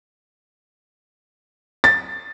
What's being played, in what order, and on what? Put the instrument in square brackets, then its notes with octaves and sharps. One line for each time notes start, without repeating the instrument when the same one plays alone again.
[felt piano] A6